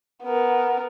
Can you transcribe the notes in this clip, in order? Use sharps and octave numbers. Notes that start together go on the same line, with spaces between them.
B3 A#4